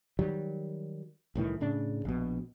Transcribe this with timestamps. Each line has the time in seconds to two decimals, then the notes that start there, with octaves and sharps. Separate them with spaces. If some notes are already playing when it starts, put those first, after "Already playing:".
0.19 D#3 F#3 G3
1.35 C2 A2 D#3 E3
1.60 A2 C#3 D4
2.05 A#1 B2